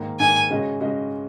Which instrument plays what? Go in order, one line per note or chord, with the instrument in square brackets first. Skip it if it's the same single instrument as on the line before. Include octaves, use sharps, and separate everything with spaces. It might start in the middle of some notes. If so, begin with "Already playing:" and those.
Already playing: [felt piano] G#2 D#3 A#3
[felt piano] G#2 D#3 A#3 [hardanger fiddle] G#5
[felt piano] C#3 G#3 C#4 F#4 D#5
C#3 G#3 C#4 F#4 D#5